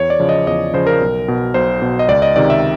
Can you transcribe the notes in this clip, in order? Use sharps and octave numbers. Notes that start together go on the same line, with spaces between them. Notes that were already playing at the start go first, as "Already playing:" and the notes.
Already playing: E2 C#5
D5
C#3 F3
D#5
E2 D#5
C#3 F3 C5
A#4
B1
B2
B1 C5
B2
D#5
C#2 D5
D#5
C3 D#3 D5
E5